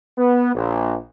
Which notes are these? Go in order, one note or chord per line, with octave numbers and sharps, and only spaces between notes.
B3
A#1